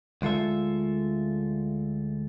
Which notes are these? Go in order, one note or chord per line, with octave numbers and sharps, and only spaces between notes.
D2 G#3 F4 A4 E5